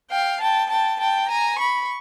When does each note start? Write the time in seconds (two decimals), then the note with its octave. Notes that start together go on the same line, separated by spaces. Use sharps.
0.10 F5 G5
0.40 G5 A5
0.70 G5 A5
0.99 G5 A5
1.29 G#5 A#5
1.58 B5 C#6